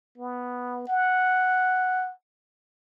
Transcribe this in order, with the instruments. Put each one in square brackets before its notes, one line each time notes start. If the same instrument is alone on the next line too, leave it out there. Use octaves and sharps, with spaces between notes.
[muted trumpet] B3
F#5